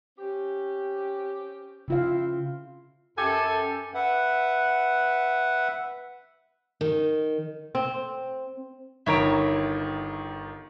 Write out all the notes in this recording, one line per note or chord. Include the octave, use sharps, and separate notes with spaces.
C4 C#4 G4
C#3 C4 E4 F4 F5
F#2 G4 A4 G#5
B4 E5 F#5
D#3
C4
G1 D#3 E4 C#5 A#5 D7